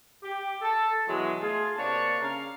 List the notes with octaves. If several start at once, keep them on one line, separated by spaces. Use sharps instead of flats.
G4
A4
B2 E3 F#3 G#3
A3 F4 G#4
C3 A#3 D4 C#5 D5 A5
C#3 F5 A#5